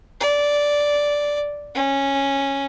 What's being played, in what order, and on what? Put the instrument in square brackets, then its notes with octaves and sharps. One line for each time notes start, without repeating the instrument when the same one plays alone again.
[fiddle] D5
C#4